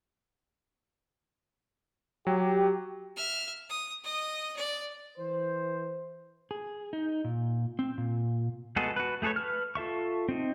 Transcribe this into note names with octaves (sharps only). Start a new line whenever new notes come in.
F#3 G4
E5 F6
D#6
D#5 D#6
D5
E3 C5
G#4
D#4
A#2
C4
A#2
G#3 B3 F#4 G#4 A4
F#4 B4
A3 G#4 A4 B4 C#5
B4 F6
F4 A4 E5 C#6
C4 D#4